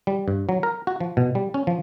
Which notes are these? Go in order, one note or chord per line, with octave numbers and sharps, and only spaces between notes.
G3
G2
F#3
A#4
F#4
F3
B2
G3
C#4
F3